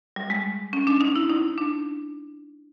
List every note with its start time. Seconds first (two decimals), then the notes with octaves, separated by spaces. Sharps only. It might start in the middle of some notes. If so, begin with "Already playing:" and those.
0.16 G3
0.30 G#3
0.73 C#4
0.87 D4
1.01 D#4
1.16 E4
1.30 D#4
1.58 D4